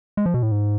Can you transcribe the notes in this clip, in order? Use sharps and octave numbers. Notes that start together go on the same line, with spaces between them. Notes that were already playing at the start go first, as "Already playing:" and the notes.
G#3
F3
B2
A2
G#2